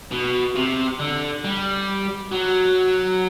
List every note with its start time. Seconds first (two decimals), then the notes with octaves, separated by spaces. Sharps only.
0.11 B2
0.55 C3
0.99 D3
1.44 G3
2.31 F#3